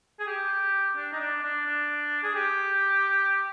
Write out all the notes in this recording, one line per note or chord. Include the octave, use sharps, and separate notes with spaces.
G#4
G4
D4
D#4
D4
D4
D4
G#4
G4